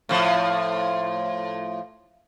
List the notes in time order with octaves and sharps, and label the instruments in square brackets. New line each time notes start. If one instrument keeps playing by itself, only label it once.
[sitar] A2 F3